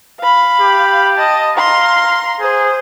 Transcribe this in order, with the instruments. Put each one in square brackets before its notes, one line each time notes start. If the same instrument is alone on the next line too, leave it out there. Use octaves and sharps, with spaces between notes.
[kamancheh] F5 B5
[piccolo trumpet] G4
[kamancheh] D#5 A5
[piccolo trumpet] F5 [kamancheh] A#5 C6
[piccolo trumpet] G#4 [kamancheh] C5